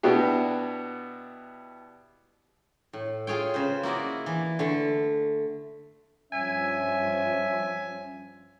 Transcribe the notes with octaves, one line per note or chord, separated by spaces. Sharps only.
B2 B3 D4 E4 F#4 G4
A2
F4 G#4 C#5 G5
C#3 B4 C5
A#3 E4 F#4 D5 D#5
E3
D3 A3
G2 F3 C#4 E5 G#5